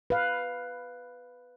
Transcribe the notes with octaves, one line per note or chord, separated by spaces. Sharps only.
B4 F5